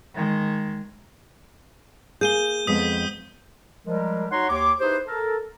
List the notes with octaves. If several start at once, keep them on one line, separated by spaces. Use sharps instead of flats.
D#3 G#3
A#3 G#4 G6 D#7 G7
F2 G#3 B3 D#6 B6
F3 G3 G#3 A#4
D#4 F#4 C#5 F#5 A#5 C6
D#2 G4 C#5 C6 D6
D#4 E4 G4 G#4 B4 C5
A4 A#4